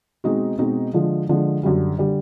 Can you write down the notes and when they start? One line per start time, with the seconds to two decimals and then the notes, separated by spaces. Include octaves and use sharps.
0.24 B2 G#3 C4 D#4 F#4
0.58 B2 G#3 C4 D#4 F#4
0.94 D3 F3 G#3
1.29 D3 F3 G#3
1.63 F#2 D3 G3
1.98 D3 G3